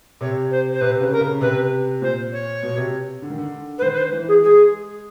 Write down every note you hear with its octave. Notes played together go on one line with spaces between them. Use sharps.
C3 C#5
C5
C5
C3 B4
C#3
A#4
C#3
C3 B4
A#2 C5
C#5
B2
C3
D3
D#3
D3
B4
D#3 C5
B4
C5
E3
G#4
G#3 G#4